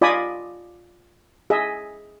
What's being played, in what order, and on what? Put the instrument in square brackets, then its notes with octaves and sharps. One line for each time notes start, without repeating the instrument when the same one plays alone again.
[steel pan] F4 D5 D#5 G#5 B5 D#6
G#4 D#5 E5